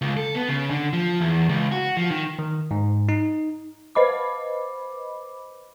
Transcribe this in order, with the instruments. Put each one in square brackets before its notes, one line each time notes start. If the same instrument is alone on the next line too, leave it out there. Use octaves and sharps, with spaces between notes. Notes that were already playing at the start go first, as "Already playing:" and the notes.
[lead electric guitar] C#2
A4
B3
C#3
D3
F3
E2
C#2
F#4
F3
D#3
[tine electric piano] D#3
G#2
D#4
[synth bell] B4 C5 D#5 B5 D6